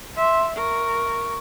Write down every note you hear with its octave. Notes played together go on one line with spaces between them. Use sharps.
E5 C6
A#4 C#6